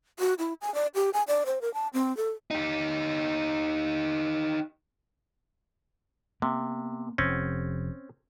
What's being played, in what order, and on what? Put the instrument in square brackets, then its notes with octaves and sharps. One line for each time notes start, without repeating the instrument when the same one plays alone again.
[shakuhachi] F#4
E4
G#5
D5
G4
G#5
D5
C5
A#4
A5
C4
A4
[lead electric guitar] D#4 G4
[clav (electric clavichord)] C3 [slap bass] A#3 B3
[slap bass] F1 [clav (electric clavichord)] C4 C#4